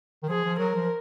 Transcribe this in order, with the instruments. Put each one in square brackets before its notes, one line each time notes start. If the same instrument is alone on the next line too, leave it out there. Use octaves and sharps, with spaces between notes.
[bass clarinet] D#3
[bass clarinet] F3 [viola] G#4
[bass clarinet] F3
[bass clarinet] F#3 [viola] A#4
[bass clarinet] F3